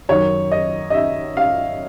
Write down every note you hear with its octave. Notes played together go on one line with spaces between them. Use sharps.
F#2 D#3 C#5
D#5
D#5
E5
F5